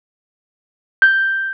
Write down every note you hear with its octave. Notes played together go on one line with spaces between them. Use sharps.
G6